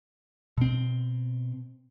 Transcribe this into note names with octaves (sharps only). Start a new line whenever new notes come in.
B2 C4